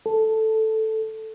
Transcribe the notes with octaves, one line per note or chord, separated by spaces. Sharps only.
A4